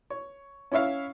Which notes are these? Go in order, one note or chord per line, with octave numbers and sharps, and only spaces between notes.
C#5
C#4 E4 C#5 E5 F5